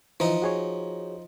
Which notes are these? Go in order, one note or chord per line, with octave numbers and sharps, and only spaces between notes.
E3 F3 D#4
F#4 G#4 C#5